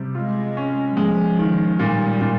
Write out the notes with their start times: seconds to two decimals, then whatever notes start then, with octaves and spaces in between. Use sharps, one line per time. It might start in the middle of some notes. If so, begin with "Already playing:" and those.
Already playing: C3 G3
0.15 G#3 F4
0.57 C#4
0.97 F3 G#3
1.39 D#3
1.79 A#2 G3
2.21 A#2